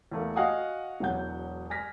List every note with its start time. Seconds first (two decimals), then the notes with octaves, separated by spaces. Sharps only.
0.12 E2 A3 A#3
0.36 F#4 D#5 F5 F#5 G#5 D#6
1.00 E1 E2 F#3 F#5 G6
1.70 G#5 F6 A#6 B6